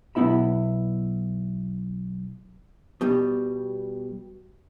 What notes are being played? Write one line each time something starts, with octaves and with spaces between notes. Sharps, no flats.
B1 B3 E4 E5 B5
B2 G3